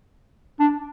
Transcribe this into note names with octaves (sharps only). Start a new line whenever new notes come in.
D4